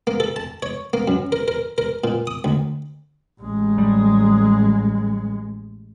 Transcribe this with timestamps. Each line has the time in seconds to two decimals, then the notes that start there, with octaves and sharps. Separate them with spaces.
0.07 A#3
0.20 A4
0.36 A5
0.62 C#5
0.93 A#3
1.08 F#2
1.32 A#4
1.48 A#4
1.78 A#4
2.04 A#2
2.27 D#6
2.44 D2
3.41 A1 G#3
3.78 G3